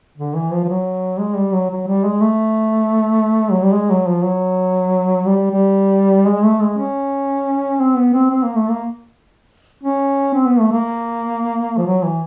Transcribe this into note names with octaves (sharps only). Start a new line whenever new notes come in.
D3
E3
F3
F3
F#3
G#3
G3
F#3
F#3
G3
G#3
A3
F#3
G3
G#3
F#3
F3
F#3
G3
G3
G#3
A3
G#3
C#4
C4
B3
C4
C4
A#3
A3
A#3
C#4
C4
B3
A3
A#3
F3
F#3
E3